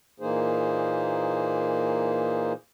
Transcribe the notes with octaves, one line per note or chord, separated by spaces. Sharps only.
A#2 E3 A#3 D#4 G#4 C5